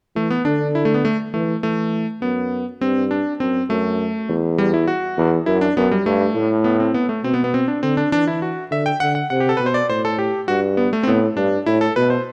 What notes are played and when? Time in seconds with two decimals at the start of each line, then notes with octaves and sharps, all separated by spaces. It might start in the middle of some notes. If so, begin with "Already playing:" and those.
0.15 E3 A3
0.30 B3
0.45 D3 D4
0.75 E4
0.85 A3
0.94 B3
1.05 A3
1.34 E3 A3
1.63 E3 A3
2.22 F#2 B3
2.81 G2 C4
3.11 D4
3.40 F#2 C4
3.70 F#2 A3
4.29 E2
4.58 G3
4.74 E4
4.88 F#4
5.17 E2
5.46 F#2 E4
5.61 D4
5.76 F#2 B3
5.91 G3
6.06 G2 A3
6.35 A2
6.64 B3
6.80 C4
6.94 B3
7.09 A3
7.24 B2 C4
7.34 B3
7.44 B3
7.54 C4
7.68 D4
7.83 D3 C4
7.97 D4
8.12 E3 D4
8.27 E4
8.42 F#4
8.71 D3 E5
8.86 G5
9.00 D3 F#5
9.15 F#5
9.30 C3 F#5
9.40 G4
9.49 A4
9.57 B2 B4
9.66 C5
9.74 D5
9.89 A2 C5
10.05 A4
10.18 G4
10.48 G2 F#4
10.77 B3
10.93 A3
11.03 C4
11.07 A2 B3
11.37 G2 D4
11.66 A2 E4
11.81 A4
11.96 B2 B4
12.10 C5